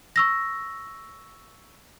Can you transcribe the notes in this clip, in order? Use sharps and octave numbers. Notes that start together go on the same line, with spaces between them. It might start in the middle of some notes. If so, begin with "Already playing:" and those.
C#6 E6 A#6